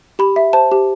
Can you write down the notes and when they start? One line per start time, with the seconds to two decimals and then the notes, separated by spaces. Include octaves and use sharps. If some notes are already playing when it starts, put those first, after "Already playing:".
0.19 G4 B5
0.36 E5
0.53 C5 A5
0.72 G4